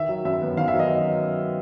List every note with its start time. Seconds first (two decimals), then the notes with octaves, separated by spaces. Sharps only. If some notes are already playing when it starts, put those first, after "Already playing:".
Already playing: D#3 E5
0.09 F#3
0.25 F#2 E5
0.42 B3
0.57 D#3 F5
0.68 E5
0.74 F#3
0.79 D#5